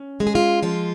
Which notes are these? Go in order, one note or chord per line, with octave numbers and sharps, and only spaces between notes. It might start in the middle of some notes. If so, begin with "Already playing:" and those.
Already playing: C#4
G#3
G#4
F4
F3 F4